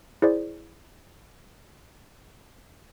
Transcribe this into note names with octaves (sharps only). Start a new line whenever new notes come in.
E4 G#4 C5 D5